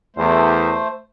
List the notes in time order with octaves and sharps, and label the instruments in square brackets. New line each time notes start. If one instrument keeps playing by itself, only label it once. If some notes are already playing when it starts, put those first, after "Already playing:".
[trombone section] E2 [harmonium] A3 C5